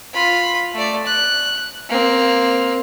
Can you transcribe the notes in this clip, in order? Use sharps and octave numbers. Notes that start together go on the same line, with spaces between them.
F4 B5
A3 D5
F#6
A#3 C4